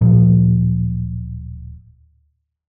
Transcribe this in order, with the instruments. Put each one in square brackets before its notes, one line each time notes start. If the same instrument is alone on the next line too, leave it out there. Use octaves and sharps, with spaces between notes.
[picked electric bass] D1 A#2 F3